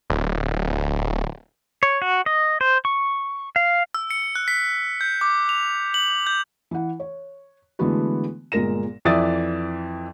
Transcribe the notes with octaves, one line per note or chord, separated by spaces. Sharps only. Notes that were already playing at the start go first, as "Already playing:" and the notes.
D1
C#5
F#4
D#5
C5
C#6
F5
E6
C#7
F#6
B6
G6
D6
F7
F#7
G6
E3 F#5
C#5
D3 E3 G#3 A3 B3 F#4
G1 A#2 G#3 A#4 A#6 E7
F2 E3 D5 E5 D#6 A6